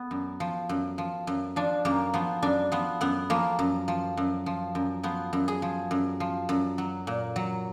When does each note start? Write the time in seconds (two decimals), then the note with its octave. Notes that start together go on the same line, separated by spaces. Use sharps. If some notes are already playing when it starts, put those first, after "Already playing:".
Already playing: B3
0.11 F#2
0.40 F3
0.69 F#2
0.98 F3
1.27 F#2
1.56 F3 D4
1.85 F#2 A#3
2.14 F3 B3
2.42 F#2 D4
2.72 F3 B3
3.01 F#2 B3
3.30 F3 A#3
3.59 F#2
3.88 F3
4.17 F#2
4.46 F3
4.75 F#2
5.03 F3 B3
5.33 F#2
5.48 G#4
5.62 F3
5.91 F#2
6.20 F3
6.49 F#2
6.78 F#3
7.07 A#2
7.36 F#3